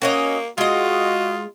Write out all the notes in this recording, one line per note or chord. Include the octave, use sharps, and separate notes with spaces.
A#3 C#4 F#4 C#5 D#5
G#3 F4 F#4 D#5